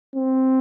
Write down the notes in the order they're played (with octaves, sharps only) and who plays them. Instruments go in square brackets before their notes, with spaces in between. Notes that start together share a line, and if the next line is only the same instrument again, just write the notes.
[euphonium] C4